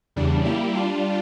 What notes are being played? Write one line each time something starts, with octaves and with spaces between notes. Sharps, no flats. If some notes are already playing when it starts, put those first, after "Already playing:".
E2 C#3 G3 D4
G3 A#3 E4 G4
G3 D4 F4